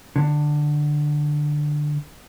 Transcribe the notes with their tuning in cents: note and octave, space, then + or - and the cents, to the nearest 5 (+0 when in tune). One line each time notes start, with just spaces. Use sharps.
D3 +15